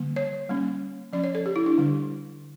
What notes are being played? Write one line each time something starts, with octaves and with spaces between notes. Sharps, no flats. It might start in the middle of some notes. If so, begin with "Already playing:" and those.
Already playing: D3 G3 A#3
C#5
G3 A#3 C#4
F3 C#4 D5
C#5
A4
G4
E4
D4
D3 G3 D4